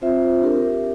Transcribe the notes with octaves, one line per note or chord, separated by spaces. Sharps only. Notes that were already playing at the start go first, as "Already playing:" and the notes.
C4 F4 C5 E5
D4 G4 A#4